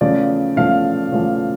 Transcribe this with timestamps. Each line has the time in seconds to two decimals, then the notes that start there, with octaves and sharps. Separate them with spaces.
0.01 E2 C#3 F3 A3 D5
0.57 E2 C#3 F3 A3 F5
1.12 E2 C#3 F3 A3